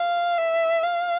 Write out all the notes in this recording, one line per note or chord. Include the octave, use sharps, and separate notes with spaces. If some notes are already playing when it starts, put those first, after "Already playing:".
Already playing: F5
E5
F5